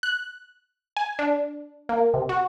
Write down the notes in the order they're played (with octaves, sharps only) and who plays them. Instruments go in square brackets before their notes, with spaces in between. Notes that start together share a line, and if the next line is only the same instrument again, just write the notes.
[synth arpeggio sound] F#6
G#5
D4
A#3
C3
F#4